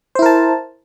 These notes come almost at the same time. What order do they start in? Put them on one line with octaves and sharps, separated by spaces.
C5 E4 A#4 A5